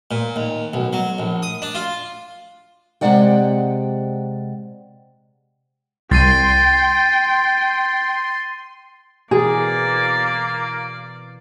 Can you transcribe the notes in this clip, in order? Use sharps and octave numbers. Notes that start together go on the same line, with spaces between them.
A#2
D#2
B1
F#3
A#1
D#6
D4
F4
C3 D#3 G#3 D5 F#5 G5
C2 G5 C6 A6 C7 D#7
B2 E3 A#3 G#4 A#4 D5